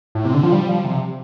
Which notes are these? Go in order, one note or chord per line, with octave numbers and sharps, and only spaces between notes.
A2
C3
D3
F3
G3
F3
C3